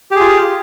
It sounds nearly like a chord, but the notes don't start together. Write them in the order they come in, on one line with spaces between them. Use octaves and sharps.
G4 G#4 F4